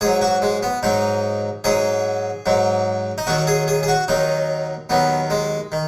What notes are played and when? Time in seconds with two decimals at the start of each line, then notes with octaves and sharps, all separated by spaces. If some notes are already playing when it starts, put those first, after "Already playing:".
0.01 G#2 F#3 G#4
0.21 F#4
0.42 G#3
0.63 B3
0.83 G#2 F#3 D#4
1.64 G#2 F#3 G#4
2.46 G#2 F#3
3.18 D#4
3.27 D#2 D#3 F#3 F#4
3.47 G#4
3.68 G#4
3.83 G#4
3.88 F#4
4.08 D#2 D#3 F#3 D#4
4.89 D#2 D#3 F#3 B3
5.30 G#3
5.72 D#3